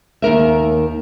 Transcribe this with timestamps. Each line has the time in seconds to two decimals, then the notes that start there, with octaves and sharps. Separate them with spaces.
0.22 D#2 D#4 A#4 E5